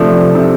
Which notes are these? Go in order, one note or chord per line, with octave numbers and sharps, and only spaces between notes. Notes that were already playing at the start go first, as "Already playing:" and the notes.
Already playing: C3 F3 A3 D4
C3